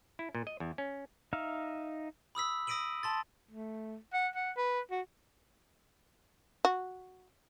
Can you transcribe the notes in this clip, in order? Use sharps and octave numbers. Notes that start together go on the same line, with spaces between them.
E4
A#2
D#5
E2
C#4
D#4 E5 F5
B5 D#6 E6 B6
D#6 A#6 B6 D7 D#7 F#7
A5 C6 A6
A3
F#5
F#5
B4
F#4
F#4